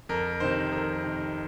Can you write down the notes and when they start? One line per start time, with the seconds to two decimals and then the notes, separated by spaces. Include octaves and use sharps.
0.09 F2 A#4
0.40 C3 D#3 C5
0.72 F2 A#4
1.04 C3 D#3